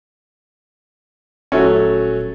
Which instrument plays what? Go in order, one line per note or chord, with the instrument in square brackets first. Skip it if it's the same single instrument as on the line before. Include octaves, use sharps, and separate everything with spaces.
[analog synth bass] D#1 [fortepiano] F#3 A3 C#4